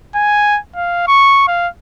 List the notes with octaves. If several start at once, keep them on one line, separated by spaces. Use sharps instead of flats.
G#5
F5
C#6
F5